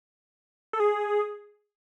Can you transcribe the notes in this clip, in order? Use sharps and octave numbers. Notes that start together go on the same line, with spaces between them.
A4
G#4